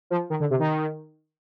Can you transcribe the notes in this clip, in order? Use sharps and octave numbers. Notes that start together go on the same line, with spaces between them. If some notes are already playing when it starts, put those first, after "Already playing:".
F3
D#3
D3
C3
D#3